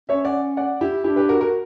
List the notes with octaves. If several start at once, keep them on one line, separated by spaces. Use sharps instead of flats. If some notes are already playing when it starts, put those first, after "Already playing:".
C#4 C#5 E5
D5 F#5
D5 F#5
E4 G4
D4 E4 G4
G4 B4
F#4 A#4
F#4 A#4